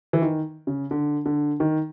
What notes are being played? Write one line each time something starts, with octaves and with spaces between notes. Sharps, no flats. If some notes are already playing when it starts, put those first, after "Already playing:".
E3
D#3
C#3
D3
D3
D#3